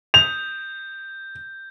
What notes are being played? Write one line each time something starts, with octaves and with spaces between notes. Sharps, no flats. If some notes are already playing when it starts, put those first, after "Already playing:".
G6 F7